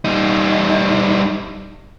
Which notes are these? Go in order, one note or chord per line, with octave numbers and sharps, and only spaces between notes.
G3 D#4